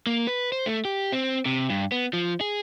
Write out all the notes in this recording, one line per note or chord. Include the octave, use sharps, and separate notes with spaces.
A#3
B4
C5
A3
G4
C4
C3
G2
B3
F3
G#4